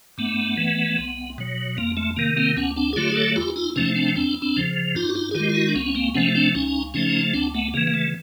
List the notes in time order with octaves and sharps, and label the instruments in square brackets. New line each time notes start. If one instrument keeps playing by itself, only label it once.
[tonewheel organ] G2 A3 B3
E3 A3
C2
B2 F#3
F2 A#3
A3
C3 D#3 A#3
A#3 C4
D2 B3 C#4
C4 D4
G#4
D3 F#3 A3 F4 G4
G#4
G4 A4
E2 F4 G4
D#4 F4
C3 F3 A3 C#4 D#4
C4 D4
E2 C4 D4
C4 D4
C#3 F3
G2 D#4 F4
F#4
D#4 F4
G#4
D#3 G#3 F4 G4
F4
E4 F#4
D4
C#2 B3 C#4
C#4
A#3 C4
C3 F3 A3 B3 C#4
C4 D4
C#2 C#4 D#4
C#3 F3 A3 C#4 D#4
D2 C4 D4
A3 B3
C#3 E3 A#3
A#3
A3